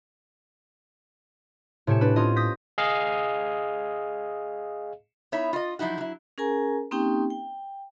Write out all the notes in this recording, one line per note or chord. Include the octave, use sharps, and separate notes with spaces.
A2 C3 G4 G#5 C#7 E7
D4 B4
C4 C#4 F4 D#5
D#6 G6 A#6 B6
G#4 D#5 F5
B3 D#4 E4 C#5 E5
F4 D#5
F3 F#3 D#4 E4 F#4
F#3 E4
C#4 G#4 A#4 G#5 A#5
A#3 C4 C#4 D#4 G4 G5
G5